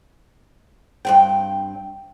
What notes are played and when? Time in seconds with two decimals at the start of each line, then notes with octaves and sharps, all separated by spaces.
1.05 G2 C4 G5